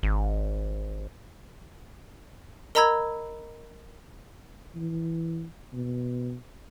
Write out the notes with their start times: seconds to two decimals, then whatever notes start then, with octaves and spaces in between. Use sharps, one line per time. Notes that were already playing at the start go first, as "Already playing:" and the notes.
0.03 G#1
2.75 A#4 D#5 A#5 B5 E6 G#6
4.75 E3
5.73 B2